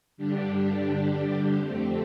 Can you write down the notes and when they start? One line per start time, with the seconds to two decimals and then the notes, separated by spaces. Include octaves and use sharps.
0.17 G2 D3 G3 D4 G4
1.58 F2 D3 A3 C4 G4